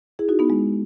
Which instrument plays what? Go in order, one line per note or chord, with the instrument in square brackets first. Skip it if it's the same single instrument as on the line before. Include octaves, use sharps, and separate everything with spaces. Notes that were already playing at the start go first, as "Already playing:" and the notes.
[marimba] E4 G#4
D#4 F#4
B3 D#4
G#3